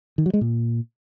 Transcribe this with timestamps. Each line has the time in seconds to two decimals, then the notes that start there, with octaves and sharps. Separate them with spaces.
0.18 D#3
0.26 F#3
0.34 G#3
0.41 A#2